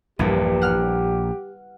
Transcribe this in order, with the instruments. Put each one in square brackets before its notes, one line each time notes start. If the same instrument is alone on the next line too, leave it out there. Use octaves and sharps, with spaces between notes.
[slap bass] A#1 A#2 [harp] E2 G2 E3 [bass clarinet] G4
[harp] F#5 F6